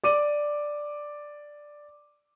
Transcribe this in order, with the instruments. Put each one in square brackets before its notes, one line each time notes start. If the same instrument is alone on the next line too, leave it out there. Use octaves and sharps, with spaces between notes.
[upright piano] D5 D6 D#7